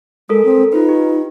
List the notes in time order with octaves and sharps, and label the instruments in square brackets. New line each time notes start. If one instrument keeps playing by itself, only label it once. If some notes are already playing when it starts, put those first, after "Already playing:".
[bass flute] G#3 [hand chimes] A4 A#4 D#6
[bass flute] C4
[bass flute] D#4 [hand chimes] F4 B4
[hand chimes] G4